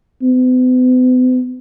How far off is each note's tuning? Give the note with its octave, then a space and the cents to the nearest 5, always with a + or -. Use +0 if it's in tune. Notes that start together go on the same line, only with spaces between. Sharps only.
B3 +45